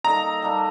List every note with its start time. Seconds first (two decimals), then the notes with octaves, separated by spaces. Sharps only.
0.04 G3 A#3 D#4 A4 A#5
0.42 G3 A#3 D#4 A4